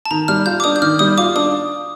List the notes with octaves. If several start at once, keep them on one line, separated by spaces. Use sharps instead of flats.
A5
D#3 A#5
G3 F6
F4 G6
D6
D4 D#6
G6
D#3 F6
G3 D#6
F4 D6
D4 D#6